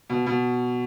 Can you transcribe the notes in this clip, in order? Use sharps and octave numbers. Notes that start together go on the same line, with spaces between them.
B2
B2